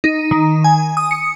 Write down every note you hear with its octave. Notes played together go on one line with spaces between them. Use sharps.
D#4
D#3
G#5
D#6
C#7